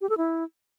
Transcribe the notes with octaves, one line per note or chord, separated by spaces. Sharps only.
G4
A4
E4